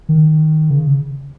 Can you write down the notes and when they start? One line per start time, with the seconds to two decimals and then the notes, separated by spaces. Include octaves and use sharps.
0.09 D#3
0.70 C#3